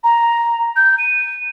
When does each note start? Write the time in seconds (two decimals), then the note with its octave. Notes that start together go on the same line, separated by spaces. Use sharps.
0.04 A#5
0.76 G6
0.98 D#7